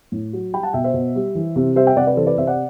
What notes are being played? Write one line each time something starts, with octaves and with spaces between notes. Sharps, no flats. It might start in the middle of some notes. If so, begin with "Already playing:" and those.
A2
F#3
G3 G5 B5
F#5 A5
B2 E5 G5
C5 E5
B2
G3
E3
C3
G3 C5 E5
E5 G5
C3 D5 F#5
B4 D5
E3 A4 C5
B4 D5
C3 C5 E5
D5 F#5